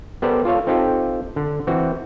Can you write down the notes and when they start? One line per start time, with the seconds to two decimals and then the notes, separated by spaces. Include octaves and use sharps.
0.22 B3 G4 A4 A#4 C5 D5
0.45 F4 A4 C#5 F5
0.67 C4 D#4 F4 G4 A4
1.36 D3
1.67 E3 C4 F#4